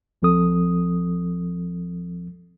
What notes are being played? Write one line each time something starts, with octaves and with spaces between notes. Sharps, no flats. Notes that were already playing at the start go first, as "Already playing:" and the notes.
C#2 F3 C4 A4 D#6